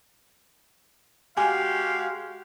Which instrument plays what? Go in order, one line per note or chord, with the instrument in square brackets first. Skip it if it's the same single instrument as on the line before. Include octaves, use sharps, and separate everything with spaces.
[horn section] G#3 F#4 G4 [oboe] F5 [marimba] G#5